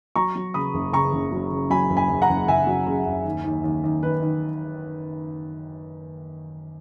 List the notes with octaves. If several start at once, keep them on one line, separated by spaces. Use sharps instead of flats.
F#3 A#5 C#6
F#3
C#3 B5 D#6
F#1
C#3 A#5 C#6
F#1
F#3
C#3
F#3 G#5 B5
F#1
G#5 B5
F#2
F#5 A#5
F#1
F#1 E5 G#5
F#3
C#3
F#2
D#2
D#2
D#2
D#2
D#3 B4
D#3